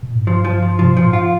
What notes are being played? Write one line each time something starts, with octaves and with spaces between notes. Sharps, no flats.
A#2
G#2
G2 F3
F3
F3
C3 F3
A#2 F3
G#2
F4